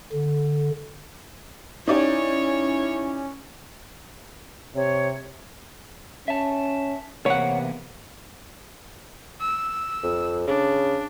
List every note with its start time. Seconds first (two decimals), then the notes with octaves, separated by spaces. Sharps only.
0.13 D3
1.88 C#4 D#4 E4 G4 C#5 D5
4.76 C3 C#5
6.28 C#4 E5 A5
7.26 E2 C3 A#3 B3 C#5 F#5
9.41 E6
10.03 F2
10.47 C#3 D4